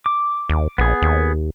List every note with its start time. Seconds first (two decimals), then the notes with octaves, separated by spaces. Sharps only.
0.06 D6
0.49 D#2
0.78 A#1 B3 G#4
1.02 D#2